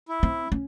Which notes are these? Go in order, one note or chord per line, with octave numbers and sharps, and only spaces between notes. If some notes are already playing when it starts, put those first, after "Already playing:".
E4
C4
C#4